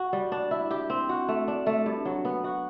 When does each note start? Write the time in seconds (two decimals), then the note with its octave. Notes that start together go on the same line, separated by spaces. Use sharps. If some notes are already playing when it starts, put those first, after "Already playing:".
Already playing: F#4
0.13 G3
0.32 D4
0.51 E4
0.71 G4
0.90 C4
1.09 F#4
1.28 A3
1.48 D4
1.66 A3
1.86 G2
2.05 F#3
2.25 B3
2.44 F#4